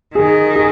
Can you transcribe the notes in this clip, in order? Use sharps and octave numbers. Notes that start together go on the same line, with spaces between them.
D#3 G#4
G#4